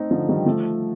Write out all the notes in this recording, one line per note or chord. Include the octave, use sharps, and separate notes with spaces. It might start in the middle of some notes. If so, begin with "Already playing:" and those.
Already playing: A3 C4 D#4
D3 F3
D#3 G3
F3 A3